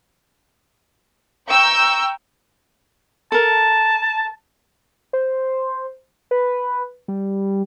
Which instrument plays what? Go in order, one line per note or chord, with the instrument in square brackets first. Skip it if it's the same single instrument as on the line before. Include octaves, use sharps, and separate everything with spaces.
[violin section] G5 A#5 C#6 E6 G6
[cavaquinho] A4 A#4 [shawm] A5
[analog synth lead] C5
B4
G3